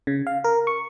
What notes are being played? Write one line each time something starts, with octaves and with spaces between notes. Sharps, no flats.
C#3
F5
A#4
C#6